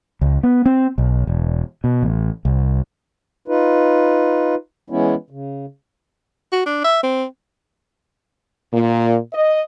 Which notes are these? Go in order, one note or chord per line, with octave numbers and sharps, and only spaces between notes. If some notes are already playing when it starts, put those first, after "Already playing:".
C#2
B3
C4
B1
E1
B2
A1
C2
D#4 F4 B4
E3 G#3 B3 C#4 E4
C#3
F#4
D4
E5
C4
A#2
D#5